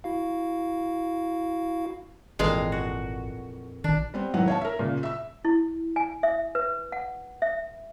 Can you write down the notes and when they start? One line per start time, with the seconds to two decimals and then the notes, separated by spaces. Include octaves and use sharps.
0.04 E4 F#4 F5
2.39 G#1 F2 A#2 E3 G#3 F5
2.72 F#4
3.84 A#1 D#3 D4
4.14 G3 B3 C4
4.34 F1 A2 D#3 F#3 B3 F#5
4.48 C#5 F5 A5
4.61 A#4 E5
4.79 A#2 C#3
5.03 E5 E6
5.45 E4
5.96 G#5
6.23 E5
6.55 B4
6.92 F#5
7.42 E5